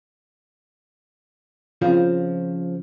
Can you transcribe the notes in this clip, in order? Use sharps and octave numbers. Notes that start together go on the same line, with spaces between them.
C#3 F3 C4 F4